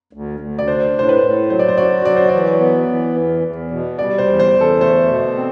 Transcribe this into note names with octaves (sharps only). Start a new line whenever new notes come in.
D2
D2
D5
D4 C5
A2 C5
B4
A2
F#3 C5
D5
C5
F#4 D5
F#3 D5
C5
E3 D5
B3
E3
E2
E2
B2
G3 D5
C5
E2
C5
E2
A4
A3 C5
B2
C4